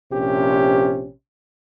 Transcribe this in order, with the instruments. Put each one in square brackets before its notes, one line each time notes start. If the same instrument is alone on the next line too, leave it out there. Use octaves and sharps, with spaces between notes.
[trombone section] A#1 C3 C#4 G4